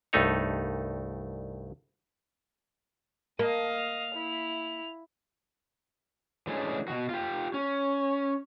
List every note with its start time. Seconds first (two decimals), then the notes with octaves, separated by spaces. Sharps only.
0.13 C2 G2 A3 D#4 C#5
3.39 A#3 D#5 F5 A5
3.78 F7
4.14 E4
6.47 E3 G#3 A3 C#4 D4
6.88 B2 D#3 F#4
7.09 F4 G4
7.54 C#4